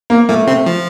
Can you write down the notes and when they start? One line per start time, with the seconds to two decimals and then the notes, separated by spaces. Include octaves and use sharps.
0.10 A#3
0.29 A#2 A3 A#3
0.47 C3 C4
0.66 F3